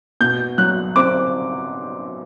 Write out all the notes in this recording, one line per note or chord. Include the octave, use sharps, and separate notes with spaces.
B2 G6
F#3 F#6
C4 D6